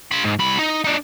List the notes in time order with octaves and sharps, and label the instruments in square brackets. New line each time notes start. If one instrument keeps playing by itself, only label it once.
[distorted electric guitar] F4 B5
G#2
C2 B5
D#4
D4 D#4